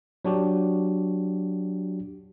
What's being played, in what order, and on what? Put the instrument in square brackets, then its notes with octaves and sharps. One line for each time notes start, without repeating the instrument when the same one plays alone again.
[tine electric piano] F#3 D4 F#4 G4